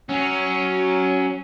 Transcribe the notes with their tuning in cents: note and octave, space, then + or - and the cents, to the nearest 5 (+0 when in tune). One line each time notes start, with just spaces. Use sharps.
F#3 +15 C#4 +0